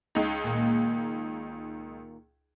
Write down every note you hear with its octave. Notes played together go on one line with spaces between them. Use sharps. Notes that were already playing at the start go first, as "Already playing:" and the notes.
C#2 D#4
A#2 D#3 A#3